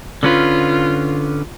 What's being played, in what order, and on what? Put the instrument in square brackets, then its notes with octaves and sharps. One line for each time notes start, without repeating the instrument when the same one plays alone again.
[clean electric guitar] D3 C#4 B4 [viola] F4